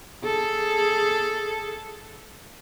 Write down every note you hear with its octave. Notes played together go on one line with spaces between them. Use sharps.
G#4 A4